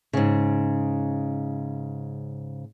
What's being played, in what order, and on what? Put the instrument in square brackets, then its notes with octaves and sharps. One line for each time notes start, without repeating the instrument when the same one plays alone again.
[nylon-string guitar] G#2 C#3